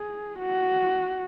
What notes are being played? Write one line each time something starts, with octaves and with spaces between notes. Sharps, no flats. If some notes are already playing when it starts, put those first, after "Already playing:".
Already playing: G#4
F#4